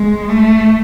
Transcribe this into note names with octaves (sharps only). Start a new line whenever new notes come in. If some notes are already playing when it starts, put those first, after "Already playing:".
Already playing: G#3
A3